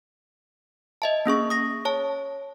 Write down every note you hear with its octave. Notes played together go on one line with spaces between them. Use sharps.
D#5 E5 A5
A#3 C#4 G#4 C#6
D#6 A#6
C#5 A5